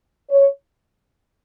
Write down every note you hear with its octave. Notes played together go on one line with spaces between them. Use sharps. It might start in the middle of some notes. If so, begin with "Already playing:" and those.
C#5